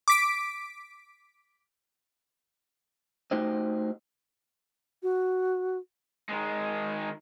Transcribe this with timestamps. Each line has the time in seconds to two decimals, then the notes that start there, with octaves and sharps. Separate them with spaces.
0.08 D6 B6 D7
3.31 A3 D#4 F#4 G4 C5 D#5
5.03 F#4
6.29 D#3 G#3